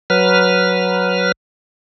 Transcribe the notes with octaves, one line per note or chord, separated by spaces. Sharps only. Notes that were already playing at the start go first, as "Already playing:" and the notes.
F#3 B4 F6